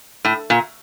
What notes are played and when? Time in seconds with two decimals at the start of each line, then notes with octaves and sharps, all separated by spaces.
0.25 A2
0.50 A#2